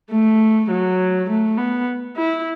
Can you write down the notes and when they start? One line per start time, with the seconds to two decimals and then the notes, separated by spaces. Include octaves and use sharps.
0.11 A3
0.70 F#3
1.29 A3
1.58 B3
2.17 E4